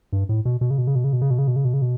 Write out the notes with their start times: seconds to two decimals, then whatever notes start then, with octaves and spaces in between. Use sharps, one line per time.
0.13 G2
0.29 A2
0.45 B2
0.61 B2
0.70 C#3
0.78 B2
0.87 C#3
0.95 B2
1.04 C#3
1.13 B2
1.21 C#3
1.30 B2
1.38 C#3
1.48 B2
1.56 C#3
1.65 B2
1.73 C#3
1.82 B2